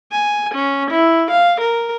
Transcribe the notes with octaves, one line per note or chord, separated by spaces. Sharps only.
G#5
C#4
E4
F5
A#4